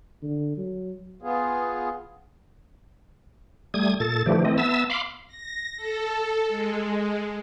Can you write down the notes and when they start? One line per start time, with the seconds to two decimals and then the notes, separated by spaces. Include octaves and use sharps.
0.23 D3
0.58 F#3
1.22 B3 F4 G#4
3.74 G3 A3 D#6 G#6
4.00 A#2 A4 A6
4.26 D3 E3 F3 A3 G4
4.45 E3 A3 C4 D#5
4.58 B3 E5 A5 E6
4.90 F5 B5 C6 D6
5.27 A#6
5.77 A4
6.47 G#3